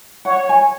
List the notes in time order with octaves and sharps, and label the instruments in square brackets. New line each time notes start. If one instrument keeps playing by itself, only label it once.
[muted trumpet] C#5 [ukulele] F#5
[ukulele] G#5